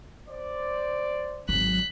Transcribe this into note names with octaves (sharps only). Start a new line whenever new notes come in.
C5 D5
G#1 F#3 F#6 B6